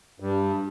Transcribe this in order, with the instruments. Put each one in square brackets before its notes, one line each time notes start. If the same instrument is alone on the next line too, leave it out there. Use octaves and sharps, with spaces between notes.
[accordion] G2